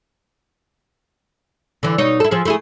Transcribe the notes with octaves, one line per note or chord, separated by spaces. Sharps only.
D3 E3
B2 D#4 C#5
E4 A4
F3 G#4 A4
A3 E4 G#4